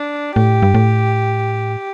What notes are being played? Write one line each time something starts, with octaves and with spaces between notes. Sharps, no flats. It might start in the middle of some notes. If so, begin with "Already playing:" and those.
Already playing: D4
A2 G4
G2
A2